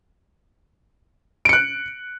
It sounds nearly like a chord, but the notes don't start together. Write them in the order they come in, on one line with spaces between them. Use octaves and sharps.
D7 C#7 F#6